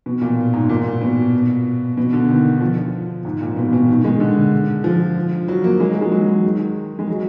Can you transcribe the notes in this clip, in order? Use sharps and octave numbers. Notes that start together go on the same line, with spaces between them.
B2
A#2
G#2
A#2
B2
B2
D3
D#3
F3
G#2
A#2
B2
A#2
B2
D#3
G#3
D3
F3
F#3
A#3
G#3
F#3
G#3
F#3
F#3
D#3
G#3
F#3